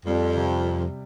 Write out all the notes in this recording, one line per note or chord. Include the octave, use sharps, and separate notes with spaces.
F2 G3
C3